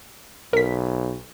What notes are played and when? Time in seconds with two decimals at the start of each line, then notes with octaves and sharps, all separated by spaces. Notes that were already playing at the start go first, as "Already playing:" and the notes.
0.53 B1 A#4 B6